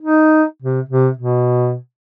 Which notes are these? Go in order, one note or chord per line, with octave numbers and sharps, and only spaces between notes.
D#4
C3
C3
B2